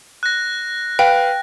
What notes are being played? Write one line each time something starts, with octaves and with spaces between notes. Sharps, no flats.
F#6 A#6
B4 F5 G5